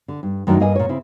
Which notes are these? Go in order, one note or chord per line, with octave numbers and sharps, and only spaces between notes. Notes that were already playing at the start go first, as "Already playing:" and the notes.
D3
G2
F#2 D#3 F#3 A3 A#3 D4
G2 A#3 G#4 D#5 G#5
A#2 C#5
C#3 C4 E4